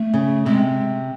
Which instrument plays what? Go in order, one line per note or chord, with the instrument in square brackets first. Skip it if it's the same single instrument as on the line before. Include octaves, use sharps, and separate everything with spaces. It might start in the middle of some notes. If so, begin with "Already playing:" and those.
Already playing: [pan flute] A3
[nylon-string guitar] C#3
[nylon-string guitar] C3 [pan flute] G#3